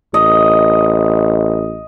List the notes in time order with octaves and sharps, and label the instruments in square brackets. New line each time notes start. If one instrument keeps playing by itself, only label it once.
[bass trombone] A1 [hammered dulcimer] D#5